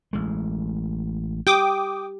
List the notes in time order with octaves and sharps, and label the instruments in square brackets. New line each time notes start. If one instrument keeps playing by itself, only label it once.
[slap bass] A1 G#3
[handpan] G4 [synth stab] G5 D6 D#6